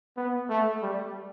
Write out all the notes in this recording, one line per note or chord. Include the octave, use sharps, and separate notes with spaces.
B3
A3
G3